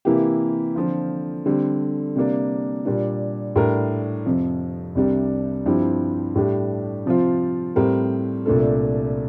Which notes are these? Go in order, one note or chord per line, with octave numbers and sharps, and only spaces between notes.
C3 E3 A#3 E4 G4
D3 F3 C4 F4
D3 G3 C4
C3 G3 A#3 D4
A#2 G3 D4
A2 G3 D4 G4 A#4
F2 C3 F3
C2 C3 G3 D4
G2 F3 C4 E4 G4
A2 G3 D4 G4
C3 F3 C4 F4
A2 G3 C4 G4 A#4
C2 A#2 A3 D4 A4